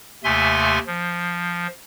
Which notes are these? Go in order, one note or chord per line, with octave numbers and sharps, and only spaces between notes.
D#2 C3 A3 E5 G#5 C6
F3